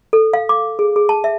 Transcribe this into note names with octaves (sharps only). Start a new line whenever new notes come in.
A4
F5
D6
G#4
G#4
A5
E5